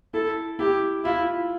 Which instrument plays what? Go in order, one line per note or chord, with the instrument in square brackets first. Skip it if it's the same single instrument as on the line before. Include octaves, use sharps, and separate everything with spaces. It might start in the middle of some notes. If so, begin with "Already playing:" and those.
[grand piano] E4 [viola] A4
[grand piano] E4 [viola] G4
[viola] E4 [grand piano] F4